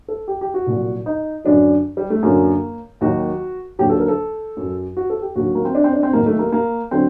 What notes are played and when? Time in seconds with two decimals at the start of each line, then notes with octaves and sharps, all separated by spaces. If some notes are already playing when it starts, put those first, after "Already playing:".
0.08 A4
0.28 G4
0.41 G4
0.54 F#4
0.67 C2 A#2 F#3
1.06 D#4
1.44 F#2 D3 F#3 D4
1.97 G3
2.10 A3
2.23 F#2 D3 F#3 A#3
3.01 D#2 D#3 F#3 F#4
3.79 D#2 D3 F#3 G4
3.90 A4
3.99 A#4
4.08 A4
4.57 F#2 F#3
4.97 F#4
5.10 A4
5.22 G4
5.35 D#2 D3 F#3 F#4
5.55 A#3
5.65 C4
5.75 D4
5.84 C4
5.93 D4
6.03 C4
6.13 D#2 D#3 F#3 A#3
6.26 A3
6.39 A#3
6.52 A#3
6.91 D3 F#3 C4